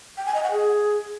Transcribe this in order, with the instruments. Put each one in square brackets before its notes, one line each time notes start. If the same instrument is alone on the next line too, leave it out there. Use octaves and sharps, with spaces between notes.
[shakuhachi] G5
G#5
D#5
F#5
G#4